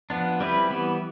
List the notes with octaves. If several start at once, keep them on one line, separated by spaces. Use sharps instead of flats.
F3 B3 D4
G3 C4 E4 B4
E3 G3 B3